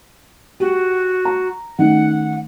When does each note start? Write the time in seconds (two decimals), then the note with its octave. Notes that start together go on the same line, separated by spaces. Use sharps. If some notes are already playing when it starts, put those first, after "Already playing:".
0.60 F#4 G4
1.25 A#5
1.79 D#3 A3 C#4 F#5